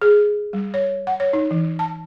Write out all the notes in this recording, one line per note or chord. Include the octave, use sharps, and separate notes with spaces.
G#4
G3
C#5
F#5
C#5
D#4
E3
A5